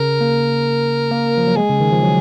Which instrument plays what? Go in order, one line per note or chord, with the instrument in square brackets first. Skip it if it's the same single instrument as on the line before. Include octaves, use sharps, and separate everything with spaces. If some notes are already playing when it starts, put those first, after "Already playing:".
Already playing: [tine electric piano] C#3 [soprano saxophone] A#4
[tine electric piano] A#3
A#3
F3
F#3
[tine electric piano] G#3 [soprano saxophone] G#4
[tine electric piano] C#3
D#3
F3
F#3